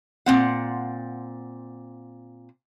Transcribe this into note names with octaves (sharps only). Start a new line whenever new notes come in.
A#2 C4 F#5